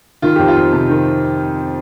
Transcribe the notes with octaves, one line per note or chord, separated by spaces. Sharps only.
D#3 F4
F2 G4
F4
F2
C3
D#3